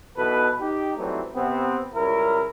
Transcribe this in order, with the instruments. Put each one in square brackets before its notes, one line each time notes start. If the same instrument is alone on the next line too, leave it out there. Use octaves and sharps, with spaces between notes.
[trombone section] B1 B2 E3 A4 B4
D#4 G4
E3 F#3 G3 A3 C4 D#4
C3 B3 C4
C#2 G3 C#4 E4 A#4